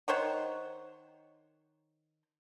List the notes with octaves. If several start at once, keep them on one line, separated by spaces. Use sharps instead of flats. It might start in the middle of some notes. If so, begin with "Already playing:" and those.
D#3 C5 C#5 F#5